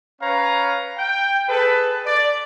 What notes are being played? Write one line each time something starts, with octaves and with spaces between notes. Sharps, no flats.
C#4 B4 C#5 F5 A#5
G5
G#4 A4 B4
D5